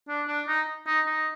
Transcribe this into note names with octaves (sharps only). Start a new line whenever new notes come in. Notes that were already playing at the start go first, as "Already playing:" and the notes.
D4
D4
D#4
D#4
D#4